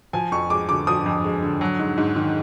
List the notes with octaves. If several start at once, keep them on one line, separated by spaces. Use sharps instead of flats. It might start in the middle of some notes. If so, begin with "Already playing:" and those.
F3 G#5
F2 C#6
G#3 D6
D3 D6
F3 D#6
F2
G#3
D3
F#3
G#2
G#2
D#3